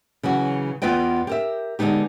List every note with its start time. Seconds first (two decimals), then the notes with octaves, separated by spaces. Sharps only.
0.23 C#3 E3 F#3 F#4
0.82 E2 B3 F4 B4 D#5 G5
1.27 G4 A#4 E5
1.79 D3 G#3 B3 D#4 G4